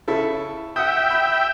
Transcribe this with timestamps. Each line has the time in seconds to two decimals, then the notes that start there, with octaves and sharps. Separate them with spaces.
0.08 C#3 E4 A4
0.76 E5 F#5 G5 D#6
1.10 B5